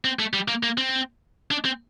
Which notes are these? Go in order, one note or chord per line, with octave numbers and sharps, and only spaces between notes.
C4
A3
G3
A#3
A#3
C4
D4
C4